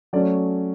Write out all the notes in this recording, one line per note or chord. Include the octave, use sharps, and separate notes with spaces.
F#3 A3 C#4 D5